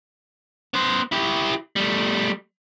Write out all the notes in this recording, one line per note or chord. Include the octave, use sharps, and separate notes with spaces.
B3 C5
E4 G4
G3 A3